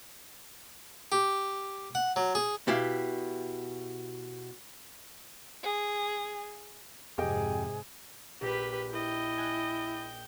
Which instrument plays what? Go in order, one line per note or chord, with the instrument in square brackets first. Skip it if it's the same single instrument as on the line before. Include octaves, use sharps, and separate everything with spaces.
[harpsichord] G4
F#5
F#3
G#4
[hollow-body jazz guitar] B2 E4 G4 F5
[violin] G#4
[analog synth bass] F2 [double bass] G#2 C3 [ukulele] G4 D#5 G5 [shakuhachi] G#4
[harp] A#1 F4 A#6 [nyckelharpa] G4 B4
[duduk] E4 [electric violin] D#5 [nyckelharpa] G5
[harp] G#5 F#6